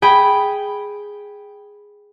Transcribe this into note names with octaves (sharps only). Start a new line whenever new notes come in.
G#4 G5 B5